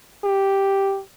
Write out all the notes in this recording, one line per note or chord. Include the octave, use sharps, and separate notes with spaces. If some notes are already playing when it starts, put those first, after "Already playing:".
G4